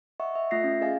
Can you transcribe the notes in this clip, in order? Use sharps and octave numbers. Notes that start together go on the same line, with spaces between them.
D#5 E5 F#5 C#6
E5
A3 F4 E5 A#6 C7
C#4
G#4 D#5 F5 G#5